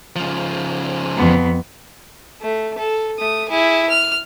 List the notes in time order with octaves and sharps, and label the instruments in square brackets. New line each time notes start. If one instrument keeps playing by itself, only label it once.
[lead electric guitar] C#3 F3
[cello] F2 B3
[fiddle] A3
A4
A3 D#6
E4 G#4
F6